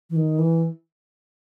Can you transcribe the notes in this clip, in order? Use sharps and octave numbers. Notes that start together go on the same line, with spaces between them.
E3
D#3
E3